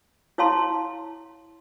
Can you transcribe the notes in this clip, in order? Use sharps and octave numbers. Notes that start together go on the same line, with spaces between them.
E4 C#5 F5 A5 C6